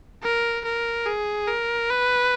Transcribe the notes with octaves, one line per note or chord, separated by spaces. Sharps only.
A#4
A#4
G#4
A#4
B4